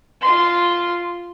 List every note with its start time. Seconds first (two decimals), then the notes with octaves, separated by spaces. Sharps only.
0.21 F4 C6